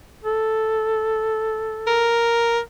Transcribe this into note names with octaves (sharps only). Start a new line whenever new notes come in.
A4
A#4